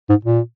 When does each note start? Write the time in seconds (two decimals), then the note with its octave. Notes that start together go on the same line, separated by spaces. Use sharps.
0.09 G#2
0.25 A#2